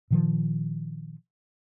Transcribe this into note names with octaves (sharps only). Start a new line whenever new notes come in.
A#2 D#3 F3